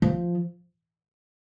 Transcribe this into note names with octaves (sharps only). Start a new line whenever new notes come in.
F3